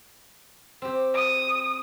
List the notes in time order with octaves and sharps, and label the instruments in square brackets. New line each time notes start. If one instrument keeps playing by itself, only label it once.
[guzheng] C4 G4
[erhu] D#6